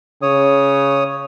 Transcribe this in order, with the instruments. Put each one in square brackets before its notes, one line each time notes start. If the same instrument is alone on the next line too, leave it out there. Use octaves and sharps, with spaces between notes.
[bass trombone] C#3 [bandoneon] C#5 D#6